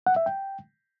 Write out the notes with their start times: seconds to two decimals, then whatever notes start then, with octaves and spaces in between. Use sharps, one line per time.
0.07 F#5
0.16 E5
0.26 G5